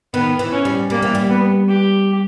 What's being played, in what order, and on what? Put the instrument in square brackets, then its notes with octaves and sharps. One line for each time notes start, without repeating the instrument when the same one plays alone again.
[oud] D#3 [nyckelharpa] B3
[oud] E3
[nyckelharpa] C#4
[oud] G3
[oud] G3 [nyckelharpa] A#3
[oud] E3
G3
[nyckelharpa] B3
G4